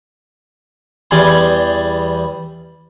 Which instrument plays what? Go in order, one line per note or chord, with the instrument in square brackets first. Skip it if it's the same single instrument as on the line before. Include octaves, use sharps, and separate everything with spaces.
[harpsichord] E2 G3 G#5 C6